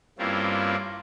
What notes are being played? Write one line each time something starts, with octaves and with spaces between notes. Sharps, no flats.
G2 A#3 C4 C#4 E4 F4